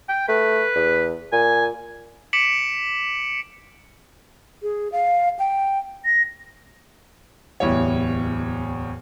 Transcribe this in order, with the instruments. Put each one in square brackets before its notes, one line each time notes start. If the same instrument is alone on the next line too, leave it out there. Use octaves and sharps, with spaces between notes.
[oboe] G5
[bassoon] A3 [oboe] B4
[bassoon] E2
[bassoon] A#2 [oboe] G#5
[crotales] D6 B6 C#7 D7 E7 F#7
[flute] G#4
F5
G5
A#6
[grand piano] D1 E2 G3 E4 C#5